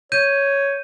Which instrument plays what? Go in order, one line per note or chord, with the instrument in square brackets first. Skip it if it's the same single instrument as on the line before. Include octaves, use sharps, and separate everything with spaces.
[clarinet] C#5 [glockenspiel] G6 D#7